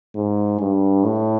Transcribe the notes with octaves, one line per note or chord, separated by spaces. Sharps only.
G#2
G2
A2